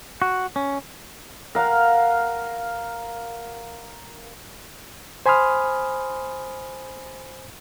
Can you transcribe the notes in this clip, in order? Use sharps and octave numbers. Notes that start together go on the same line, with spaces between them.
F#4
C#4
A#4 F5 F#5
C5 G#5 B5 C6 D#6 F6